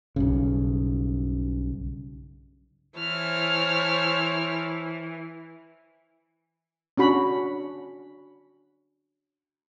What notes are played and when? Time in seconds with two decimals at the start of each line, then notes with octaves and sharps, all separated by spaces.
0.16 B1 G2 C#3
2.99 E3 C5 C#5 A5 F6
6.97 C#4 D4 F#4 B5